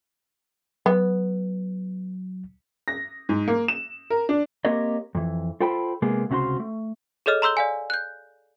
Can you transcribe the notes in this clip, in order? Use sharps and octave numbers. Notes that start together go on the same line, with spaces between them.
F#3 B3
A#6
G#2
A#3
E7
A#4
D4
A#3 C4 G4 A#4 C#5 D#5
F2 E3
F4 A4 C5 G5 A5 B5
C3 G#3 A#3 B3 G#4
C#2 C3 C#4 F#4 C5 C6
A3
G#4 A4 C#5 D#5 F6
A#5 C6 E6 G6 G7
D5 F5 G#5
F#6 G6